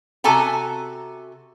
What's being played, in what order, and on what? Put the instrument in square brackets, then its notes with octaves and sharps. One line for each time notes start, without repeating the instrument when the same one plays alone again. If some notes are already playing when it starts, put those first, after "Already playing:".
[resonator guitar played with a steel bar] C3 F#4 A4 G#5 A#5